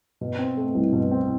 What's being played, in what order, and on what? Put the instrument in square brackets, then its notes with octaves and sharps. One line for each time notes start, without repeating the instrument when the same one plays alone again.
[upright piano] B2
C4
A3
C2
B2
C4